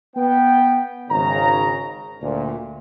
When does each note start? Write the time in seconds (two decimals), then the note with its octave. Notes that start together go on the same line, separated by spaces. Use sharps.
0.16 B3 G5
1.10 G#1 C#3 A#5
2.21 D2 A#2